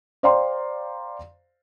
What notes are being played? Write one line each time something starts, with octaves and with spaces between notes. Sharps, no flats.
C5 D5 F5 G5 A#5 C6